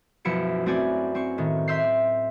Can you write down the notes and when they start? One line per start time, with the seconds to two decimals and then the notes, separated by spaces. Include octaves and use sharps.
0.25 B1 F#2 F3 E4 C#7 D7
0.66 A3 C4 F#4 D5 G#5
1.15 C4 C#6
1.38 A2 D#3
1.68 E5 C6 E6 G6 C7